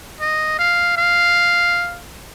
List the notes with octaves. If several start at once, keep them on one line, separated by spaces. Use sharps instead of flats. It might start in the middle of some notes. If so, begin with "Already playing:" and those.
D#5
F5
F5